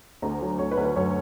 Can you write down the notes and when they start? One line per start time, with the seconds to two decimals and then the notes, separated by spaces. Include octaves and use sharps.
0.22 D2 A#5
0.42 F#3
0.59 D2 C#5
0.71 B4
0.77 D2
0.83 B4
0.95 F#2 C#5